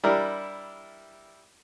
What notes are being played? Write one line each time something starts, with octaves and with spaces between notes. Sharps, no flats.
G3 D4 E4 A#4